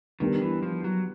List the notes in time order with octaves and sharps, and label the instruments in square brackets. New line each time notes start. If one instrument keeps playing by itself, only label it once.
[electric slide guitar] D#3 [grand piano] G3 B3 D4 G4 A#4
[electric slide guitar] E3
F3
F#3